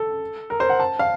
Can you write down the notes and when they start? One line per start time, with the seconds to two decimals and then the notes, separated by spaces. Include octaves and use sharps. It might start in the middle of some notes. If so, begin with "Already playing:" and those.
Already playing: A4
0.50 A#4
0.60 C5
0.70 F#5
0.80 A5
0.99 F5